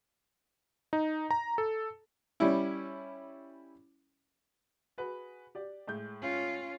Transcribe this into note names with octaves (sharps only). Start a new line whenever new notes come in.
D#4
A#5
A4
G3 C#4 E4
F#4 G#4 B4
G4 D5
A2 G#3 G6
C#4 F4